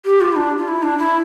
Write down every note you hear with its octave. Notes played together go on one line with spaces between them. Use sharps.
G4
F4
E4
D4
F4
E4
D4
E4